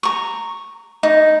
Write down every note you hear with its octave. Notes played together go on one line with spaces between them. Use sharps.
A#5 C#6
D#4